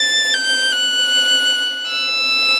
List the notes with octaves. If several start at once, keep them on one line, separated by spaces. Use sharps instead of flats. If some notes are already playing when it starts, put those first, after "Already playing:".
Already playing: A6
G6
F#6
E6